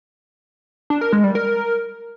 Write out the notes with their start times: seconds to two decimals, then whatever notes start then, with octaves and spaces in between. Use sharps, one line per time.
0.90 D4
1.01 A#4
1.13 G#3
1.24 G3
1.35 A#4